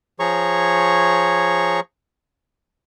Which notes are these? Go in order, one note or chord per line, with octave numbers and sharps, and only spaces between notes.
F3 G#4 C#5 A#5 C#6